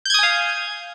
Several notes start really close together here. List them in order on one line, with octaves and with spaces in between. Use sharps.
G6 G#6 D#6 G#5 F5